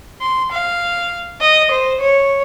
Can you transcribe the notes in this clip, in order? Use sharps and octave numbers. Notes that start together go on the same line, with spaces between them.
C6
F5
D#5
C5
C#5